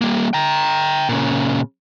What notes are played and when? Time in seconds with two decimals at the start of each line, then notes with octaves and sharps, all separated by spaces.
0.01 G3 A#3
0.33 G5 A#5
1.09 A#2 C#3